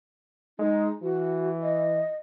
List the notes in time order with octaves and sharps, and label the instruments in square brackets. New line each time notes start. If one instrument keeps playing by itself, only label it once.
[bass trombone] G#3 [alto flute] D#4
[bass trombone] E3 [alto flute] F#4
[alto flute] D#5